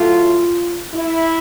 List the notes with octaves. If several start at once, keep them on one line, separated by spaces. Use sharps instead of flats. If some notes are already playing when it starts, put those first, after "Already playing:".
Already playing: A2 F#3 A3 F4
E4